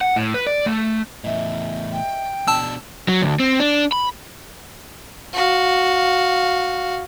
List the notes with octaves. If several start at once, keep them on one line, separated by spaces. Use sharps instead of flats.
F#5
A2
B4
D5
A3
E2 A2 D#5 E5
G5
B2 D4 A5 E6
F#3
D2
C4
D4
B5
F#4 F5